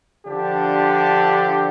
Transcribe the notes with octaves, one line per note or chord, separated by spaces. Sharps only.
D3 F3 D4 G4